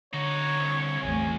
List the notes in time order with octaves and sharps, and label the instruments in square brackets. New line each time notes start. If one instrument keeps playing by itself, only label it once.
[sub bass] D3 [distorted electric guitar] D#4 F#4 [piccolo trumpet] C#5
[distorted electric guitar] C2
[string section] A1 E2 A2 [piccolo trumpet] G#5